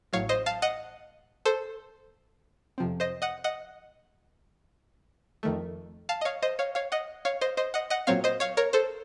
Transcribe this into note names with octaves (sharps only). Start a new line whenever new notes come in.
A1 A2 F#3 C#5 F5
C5 D#5
F5 A5
D#5 F#5
A4 C5
F2 C3 F3 C4
C5 D#5
D#5 F#5
D#5 F#5
F2 D#3 A3
F5 A5
D#5
C#5 F5
C5 D#5
C#5 F5
C#5 F5
D#5 F#5
C#5 F5
C5 D#5
C5 D#5
D#5 F#5
D#5 F#5
A#2 F#3 C4 C#5 F5
C5 D#5
C#5 F5
A#4 C#5
A4 C5